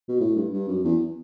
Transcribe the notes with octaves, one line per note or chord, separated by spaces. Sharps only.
B2
A2
G2
G2
F#2
E2